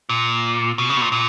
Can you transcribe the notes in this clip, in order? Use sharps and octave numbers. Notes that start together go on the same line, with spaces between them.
A#2
B2
C#3
B2
A#2
A#2